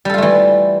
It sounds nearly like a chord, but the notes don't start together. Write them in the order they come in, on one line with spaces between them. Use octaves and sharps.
G3 A4 F4 A3 E3